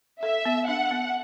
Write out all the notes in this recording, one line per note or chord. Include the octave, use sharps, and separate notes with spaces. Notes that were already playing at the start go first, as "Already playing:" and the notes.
A4 E5
B3
D4 F#5
B3